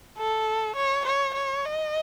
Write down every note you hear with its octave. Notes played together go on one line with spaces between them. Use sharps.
A4
C#5
C#5
C#5
D#5